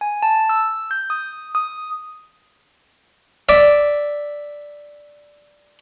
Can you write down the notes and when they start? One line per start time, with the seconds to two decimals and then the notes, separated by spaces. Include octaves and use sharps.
0.01 G#5
0.23 A5
0.49 E6
0.91 G6
1.10 D#6
1.55 D#6
3.49 D5 E5